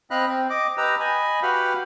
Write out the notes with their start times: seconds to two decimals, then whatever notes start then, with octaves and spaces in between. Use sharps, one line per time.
0.11 C4 D#5 F5 B5 F#6
0.27 C4
0.50 D#5 D6
0.77 G4 B4 D#5 A#5 E6
1.00 D#5 G#5 B5
1.42 F#4 G4 B4 F5 B5